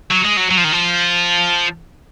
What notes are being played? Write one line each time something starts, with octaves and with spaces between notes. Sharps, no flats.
F#3
G#3
F#3
F#3
F3
D#3
F3